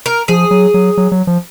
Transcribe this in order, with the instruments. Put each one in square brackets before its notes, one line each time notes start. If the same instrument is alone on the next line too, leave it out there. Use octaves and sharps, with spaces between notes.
[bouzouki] A#4
[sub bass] F3 [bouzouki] G#4
[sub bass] F#3
F#3
F#3
F#3
F3